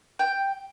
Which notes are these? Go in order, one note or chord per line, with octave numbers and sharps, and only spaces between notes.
G5